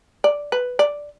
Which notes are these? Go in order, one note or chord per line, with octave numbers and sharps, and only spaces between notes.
D5
B4
D5